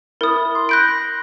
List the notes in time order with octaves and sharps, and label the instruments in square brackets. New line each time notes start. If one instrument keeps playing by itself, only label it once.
[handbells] E4 [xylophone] A#4 D#6
[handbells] C6
[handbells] B5 A#6 [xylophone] F#6 G6 D7